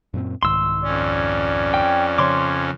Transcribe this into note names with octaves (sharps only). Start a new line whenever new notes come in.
F#2 A#2 C4
C2 G#2 D#3 C6 E6
F2 C#4 D5
G5
C#3 F3 C#5 C6 D6